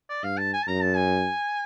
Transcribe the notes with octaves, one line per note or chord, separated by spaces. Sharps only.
D5
G2 F5
A5
G#5
A5
F#2 A#5
A5
G#5